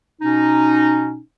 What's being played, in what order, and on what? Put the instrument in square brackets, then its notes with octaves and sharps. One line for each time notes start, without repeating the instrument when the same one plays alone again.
[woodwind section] B2 C#4 D#4